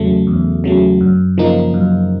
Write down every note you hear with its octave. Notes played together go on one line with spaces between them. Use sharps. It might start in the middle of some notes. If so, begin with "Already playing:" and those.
Already playing: E2 C#3 F#3 A3
E2
C#3 F#3 A3
F#2
C#3 F3 A#3 D#4
F#2